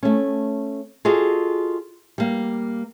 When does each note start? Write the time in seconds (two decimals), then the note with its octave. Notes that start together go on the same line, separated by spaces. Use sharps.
0.03 A3 C#4
1.05 F4 F#4 G#4 A4 D#5
2.18 G3 A#3